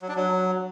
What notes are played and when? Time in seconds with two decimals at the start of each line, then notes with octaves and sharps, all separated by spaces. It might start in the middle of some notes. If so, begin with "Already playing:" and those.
0.02 F#3
0.09 D4
0.15 F#3